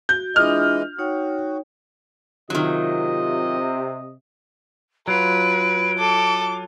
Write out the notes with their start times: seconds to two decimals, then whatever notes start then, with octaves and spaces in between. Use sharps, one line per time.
0.09 F#4 G6
0.36 E3 G#3 D4 F4 D#5 F6
0.98 D#4 F#4 C#5 G5
2.50 C3 D#3 F#3 F4 D#5
5.08 F#3 F4 B4 D7
5.99 A4 D6